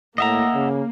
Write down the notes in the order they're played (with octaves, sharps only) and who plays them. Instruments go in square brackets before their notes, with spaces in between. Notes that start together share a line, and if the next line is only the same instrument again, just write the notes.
[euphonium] A2 [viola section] A#3 [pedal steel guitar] D#5 E5 A#5 [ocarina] F#5
[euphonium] C#3